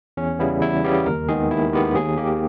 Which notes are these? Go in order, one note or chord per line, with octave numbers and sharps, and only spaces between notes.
E2 C#4
C#3 G3 B3 E4
E2 E4
C#3 G3 B3 G4
D#2 A#4
D#3 G#3 B3 G#4
D#2 E4
D#3 G#3 B3 G4
D#2 G#4
D#3 A#3 G4